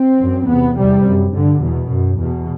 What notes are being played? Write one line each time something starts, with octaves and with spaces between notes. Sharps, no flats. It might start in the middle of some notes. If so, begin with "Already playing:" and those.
Already playing: C4
F#2
E2 C3 B3
E2 C3 G3
F#2
G2 D3
E2 B2
F#2
E2 B2